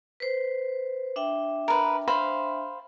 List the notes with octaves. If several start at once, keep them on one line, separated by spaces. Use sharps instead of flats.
B4 C5
D4 E5 G5
A#4 B4
C5 F5 B5